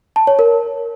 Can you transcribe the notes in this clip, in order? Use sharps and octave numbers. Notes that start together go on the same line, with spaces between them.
A5
C#5
A#4